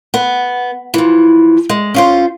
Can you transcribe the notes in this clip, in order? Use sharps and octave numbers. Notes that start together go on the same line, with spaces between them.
B3
E3 F3
G#3
C#4 F4 C5